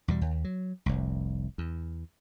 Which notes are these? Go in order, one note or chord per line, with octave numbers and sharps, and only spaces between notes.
E2 B2 G3
D#2
F#3
F1 C2
E2